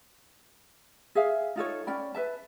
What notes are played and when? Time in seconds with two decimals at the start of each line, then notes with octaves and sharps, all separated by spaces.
1.15 G#4 E5 F5
1.56 D#4 F4 A4 C#5
1.87 C#4 D5 G5 B5
2.14 B4 E5 A5